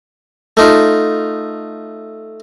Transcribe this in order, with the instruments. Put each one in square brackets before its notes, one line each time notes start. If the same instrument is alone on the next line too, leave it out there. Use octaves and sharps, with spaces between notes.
[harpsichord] A3 D#4 F4